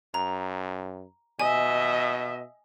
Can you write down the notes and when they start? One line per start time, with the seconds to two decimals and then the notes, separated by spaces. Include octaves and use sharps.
0.14 F#2 A#5
1.40 B2 D#5 E5 G#5